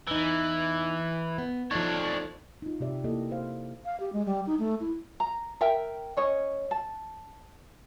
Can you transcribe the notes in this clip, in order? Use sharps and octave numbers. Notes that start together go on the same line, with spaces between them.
E2 E3 D#4
B3
F3 A3 D4 D#4 C#5
D#4 F4
C3 G4 D5 E5
A#3 E4 G4 A4 D#5
C5 F5
F5
G4
G#3
G3
D#4
A3
E4
A#5
A#4 E5 G5
C#4 C#5 D#5
A5